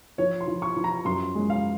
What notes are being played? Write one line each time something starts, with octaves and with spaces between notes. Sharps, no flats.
F3 C#5
C6
F3
C#6
F3
A#5
F#2 C6
G#3
F5